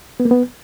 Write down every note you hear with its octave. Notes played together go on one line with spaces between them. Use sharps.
B3
A#3
B3